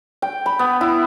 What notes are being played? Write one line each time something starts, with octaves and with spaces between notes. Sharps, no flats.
G5
B5
B3
E4